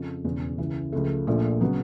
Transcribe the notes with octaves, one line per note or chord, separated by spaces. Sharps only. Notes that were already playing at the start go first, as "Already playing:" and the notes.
Already playing: F2 C#3 F3
E1 E2 C#3
C#2 C#3 E3
C#2 C#3 F3 A3
A#1 A#2 F3 A3
C#3 F#3 B3